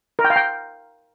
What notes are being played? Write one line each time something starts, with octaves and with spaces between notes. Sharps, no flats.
A#4
G5
F5
G5